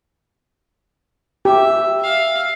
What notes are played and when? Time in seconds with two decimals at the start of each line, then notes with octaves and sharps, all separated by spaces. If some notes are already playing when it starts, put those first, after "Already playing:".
1.45 G4 E5
2.00 E5 F5